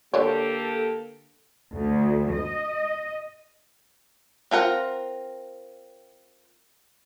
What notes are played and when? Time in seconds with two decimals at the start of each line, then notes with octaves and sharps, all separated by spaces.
0.14 D3 A#3 G4 A4 C#5
1.73 D2
2.34 D#5
4.51 C4 F4 A#4 F#5